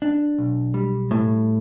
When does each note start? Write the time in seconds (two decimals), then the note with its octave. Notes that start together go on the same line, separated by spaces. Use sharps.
0.02 D4
0.39 B1
0.74 G3
1.11 A2